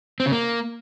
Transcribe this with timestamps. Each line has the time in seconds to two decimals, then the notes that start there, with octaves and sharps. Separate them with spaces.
0.20 C4
0.26 C#3
0.32 A#3